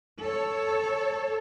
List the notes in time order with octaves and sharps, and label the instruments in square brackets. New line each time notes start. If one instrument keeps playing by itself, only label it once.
[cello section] A4 C#5